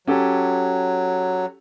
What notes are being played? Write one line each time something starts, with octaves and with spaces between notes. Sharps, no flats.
F#3 C#4 G4 A4